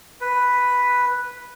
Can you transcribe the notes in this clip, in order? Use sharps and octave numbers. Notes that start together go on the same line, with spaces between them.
B4